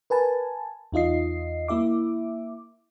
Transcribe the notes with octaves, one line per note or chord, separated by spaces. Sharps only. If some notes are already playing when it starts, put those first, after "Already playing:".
A#4 B4 G#5 A5
E2 D#4 F4 D#5 C7
A#3 E4 E5 D6